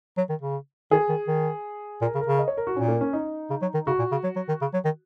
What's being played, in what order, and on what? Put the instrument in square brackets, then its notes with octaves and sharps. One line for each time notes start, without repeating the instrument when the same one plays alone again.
[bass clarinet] F#3
D#3
C#3
[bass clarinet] D#3 [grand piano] G#4
[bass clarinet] D#3
D#3
[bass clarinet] A#2 [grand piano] A#4
[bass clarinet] C#3
[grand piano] A#4
[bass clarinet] C#3
[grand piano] D#5
C#5
A#4
F#4
[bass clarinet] A#2 [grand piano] C#4
[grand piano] A#3
C#4
D#4
[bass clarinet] C#3
F#3
D#3
[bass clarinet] C#3 [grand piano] F#4
[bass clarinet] A#2
C#3
F#3
F#3
D#3
C#3
F#3
D#3